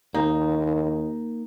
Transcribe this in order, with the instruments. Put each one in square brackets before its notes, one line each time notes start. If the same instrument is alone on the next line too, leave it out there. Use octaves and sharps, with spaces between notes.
[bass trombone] D#2 [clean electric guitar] A#3 [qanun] D#4